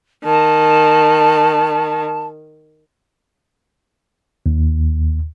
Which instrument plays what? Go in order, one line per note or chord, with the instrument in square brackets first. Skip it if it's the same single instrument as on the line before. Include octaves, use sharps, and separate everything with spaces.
[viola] D#3 [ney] A5
[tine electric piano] D#2